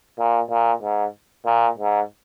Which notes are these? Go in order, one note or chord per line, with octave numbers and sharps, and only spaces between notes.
A#2
A#2
G#2
A#2
G#2